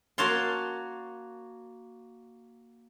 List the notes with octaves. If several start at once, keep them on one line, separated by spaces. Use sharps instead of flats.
A#3 F#4 C#5 F5 A5 C6